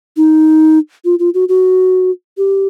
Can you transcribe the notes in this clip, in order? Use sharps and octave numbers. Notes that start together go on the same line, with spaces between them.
D#4
F4
F4
F#4
F#4
G4